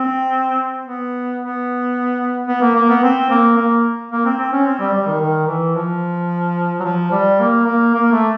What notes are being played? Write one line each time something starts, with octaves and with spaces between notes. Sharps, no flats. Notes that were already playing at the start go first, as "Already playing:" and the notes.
Already playing: C4
B3
B3
B3
A#3
A#3
B3
C4
A#3
A#3
A#3
C4
C4
C#4
C4
G3
G3
D#3
D#3
E3
F3
F#3
F3
G3
A#3
A#3
A#3
A3